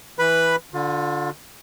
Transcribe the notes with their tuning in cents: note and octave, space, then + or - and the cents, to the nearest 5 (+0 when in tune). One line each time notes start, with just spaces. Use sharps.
E3 +0 B4 +0 B5 +0
D3 +0 F4 +35